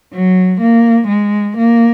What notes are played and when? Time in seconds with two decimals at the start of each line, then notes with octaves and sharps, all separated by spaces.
0.13 F#3
0.61 A#3
1.09 G#3
1.57 A#3